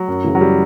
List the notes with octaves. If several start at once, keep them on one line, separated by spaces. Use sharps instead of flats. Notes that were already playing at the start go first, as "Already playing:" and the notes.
Already playing: F#3
F#2
C#3 E3
F#3
G3